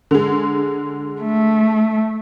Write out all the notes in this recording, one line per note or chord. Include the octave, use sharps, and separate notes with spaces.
D3 G#3
A3